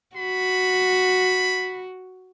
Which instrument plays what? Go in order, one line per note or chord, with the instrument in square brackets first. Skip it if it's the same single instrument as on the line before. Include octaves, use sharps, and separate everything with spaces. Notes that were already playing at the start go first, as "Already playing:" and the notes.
[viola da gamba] F#4 [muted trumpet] B5